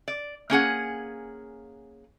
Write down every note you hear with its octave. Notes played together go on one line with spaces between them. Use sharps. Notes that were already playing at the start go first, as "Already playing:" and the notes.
D5
A#3 C#4 G#4 F#5